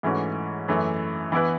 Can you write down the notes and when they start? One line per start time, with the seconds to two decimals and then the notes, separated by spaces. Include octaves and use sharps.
0.03 G#2 E3 A3 C#4 F#4
0.68 F#2 E3 A3
1.32 E3 B3 E4 B4